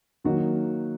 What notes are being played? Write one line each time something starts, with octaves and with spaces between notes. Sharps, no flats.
D#3 F#3 A#3 D#4 F#4